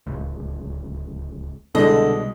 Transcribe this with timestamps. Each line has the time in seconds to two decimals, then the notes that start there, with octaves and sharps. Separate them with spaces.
0.07 D1 C#2
1.75 C2 B2 D3 G#3 D#5